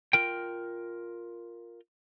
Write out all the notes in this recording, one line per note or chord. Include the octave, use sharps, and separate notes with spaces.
F4 A#4 G5